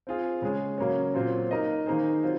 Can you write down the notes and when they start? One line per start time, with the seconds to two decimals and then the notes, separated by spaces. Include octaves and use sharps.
0.07 C4 F4 G#4
0.42 C#3 G#3 C#4 G#4
0.78 C#3 F#3 A#3 C#4
1.14 A#2 F#3 C4 F4 C5
1.51 A#3 D#4 A#4 D#5
1.86 D#3 A#3 D#4 G#4 C5
2.23 F#3 C4 F4 C5